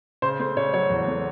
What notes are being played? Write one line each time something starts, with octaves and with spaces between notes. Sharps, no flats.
C#3 C5
A3 C5
C#3 C#5
F#3 C#5
E2
A3